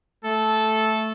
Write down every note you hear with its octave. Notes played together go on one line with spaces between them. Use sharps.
A3 A4